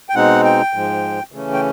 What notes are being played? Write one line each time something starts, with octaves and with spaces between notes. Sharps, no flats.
G5
B2 G#3 C4 D#4 F#5
G5
G#2 F3 G#3
C#3 E3 A3 C#4
G5